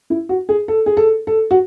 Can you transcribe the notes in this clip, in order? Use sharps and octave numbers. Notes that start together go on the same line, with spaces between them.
E4
F#4
G#4
A4
G#4
A4
A4
F#4